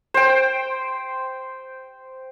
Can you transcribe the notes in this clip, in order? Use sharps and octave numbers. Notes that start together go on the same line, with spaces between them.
C5 G5